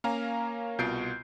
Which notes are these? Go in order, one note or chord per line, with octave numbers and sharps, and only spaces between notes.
A#3 C#4 A#4 F5 G#5 A#5
C2 B2 F4 G6 C7 D7